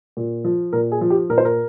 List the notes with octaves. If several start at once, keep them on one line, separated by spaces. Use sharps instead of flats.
A#2
F3
A#2 A#4
G#4
F3
G4
A#2 A#4
C5
A#4